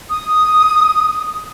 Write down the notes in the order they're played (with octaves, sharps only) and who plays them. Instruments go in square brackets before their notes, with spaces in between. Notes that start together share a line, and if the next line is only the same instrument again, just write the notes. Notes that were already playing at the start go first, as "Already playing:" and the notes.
[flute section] D#6